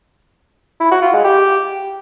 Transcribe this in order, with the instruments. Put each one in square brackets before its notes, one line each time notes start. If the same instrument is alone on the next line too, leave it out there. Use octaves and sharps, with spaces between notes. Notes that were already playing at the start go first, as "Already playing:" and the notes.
[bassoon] E4
F#4
F4
G#3
G4